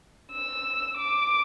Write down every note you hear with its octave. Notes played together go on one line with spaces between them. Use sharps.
E6
D6